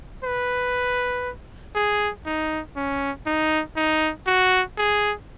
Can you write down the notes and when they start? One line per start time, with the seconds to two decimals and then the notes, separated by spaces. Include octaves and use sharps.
0.24 B4
1.75 G#4
2.26 D#4
2.76 C#4
3.26 D#4
3.76 D#4
4.27 F#4
4.78 G#4